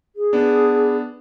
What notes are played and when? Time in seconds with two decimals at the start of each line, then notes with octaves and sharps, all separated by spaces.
0.16 G#4
0.33 B3 D4